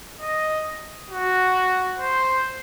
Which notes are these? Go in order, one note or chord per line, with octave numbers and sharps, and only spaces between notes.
D#5
F#4
C5